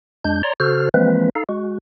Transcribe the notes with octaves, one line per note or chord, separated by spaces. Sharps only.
F2 G#3 D4 G6
C#5 D5 A#5 C6
C#3 F#4 A4 C5 F6
E3 F3 G#3 A#3 C4 B4
D#4 A4 F5
G#3 F#4